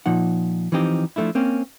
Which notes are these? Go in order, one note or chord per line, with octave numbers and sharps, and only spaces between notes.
A#2 F3 D#4 F#5
E3 F3 C4 D#4 G4
F3 F#3 A3 D4 E4
A#3 C4 C#4